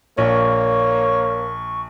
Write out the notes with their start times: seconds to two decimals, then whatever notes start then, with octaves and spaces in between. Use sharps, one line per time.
0.18 A#1 A#3 C#5 C#6